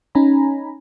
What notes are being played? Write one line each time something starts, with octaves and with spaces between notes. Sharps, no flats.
C#4 D#4 G#5 A#5 B5